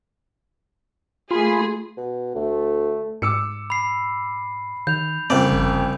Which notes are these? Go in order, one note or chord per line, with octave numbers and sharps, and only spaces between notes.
A3 A#3 F4 G#4 B5 C6
B2
D2 A3
G#2 D6 E6 C#7
B5 C7
D#3 G6 F7
C2 F2 C#3 A#3 C4 D5
G1